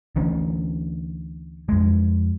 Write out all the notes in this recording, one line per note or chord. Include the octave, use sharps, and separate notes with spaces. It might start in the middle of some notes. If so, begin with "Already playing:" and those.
D2 E3 C#4
F2 G#3